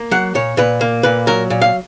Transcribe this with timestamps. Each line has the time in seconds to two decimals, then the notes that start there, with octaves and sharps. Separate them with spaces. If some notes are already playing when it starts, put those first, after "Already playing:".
Already playing: A#3
0.11 F#3 F#5
0.35 A#2 C#5
0.57 A#2 B4
0.81 A#3
1.03 A#2 B4
1.27 F#3 A#4
1.50 A#2
1.61 F5